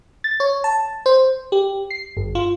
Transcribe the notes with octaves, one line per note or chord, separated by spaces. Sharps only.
A6
C#5
A5
C5
G4
C7
G1
F4